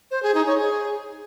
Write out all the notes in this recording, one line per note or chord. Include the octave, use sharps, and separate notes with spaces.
C5
G#4
D#4
C#5
G#4